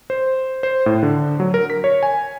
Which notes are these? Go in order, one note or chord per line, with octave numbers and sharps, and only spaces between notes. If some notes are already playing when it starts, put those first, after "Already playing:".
C5
C5
A2
D3
F#3
A#4
B6
C#5
G#5